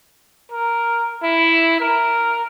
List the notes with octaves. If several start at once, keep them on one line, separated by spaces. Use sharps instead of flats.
A#4
E4
A#4